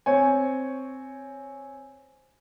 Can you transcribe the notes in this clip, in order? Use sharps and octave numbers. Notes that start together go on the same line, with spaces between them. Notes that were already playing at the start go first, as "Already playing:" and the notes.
C4 C#5 G#5